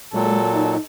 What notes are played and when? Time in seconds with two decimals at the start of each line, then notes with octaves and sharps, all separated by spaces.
0.14 A#2 F#3 G#3 A4
0.54 D#4